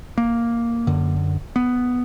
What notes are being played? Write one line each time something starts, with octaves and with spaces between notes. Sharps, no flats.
A#3
F#2 D3
B3